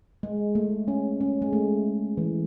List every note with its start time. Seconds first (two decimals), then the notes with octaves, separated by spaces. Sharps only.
0.23 G#3
0.55 A3
0.88 C#4
1.21 C#4
1.42 G#3
1.53 A3
2.17 E3